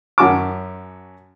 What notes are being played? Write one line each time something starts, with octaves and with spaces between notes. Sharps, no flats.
F#2 C#4 F#4 G#5 A5 D6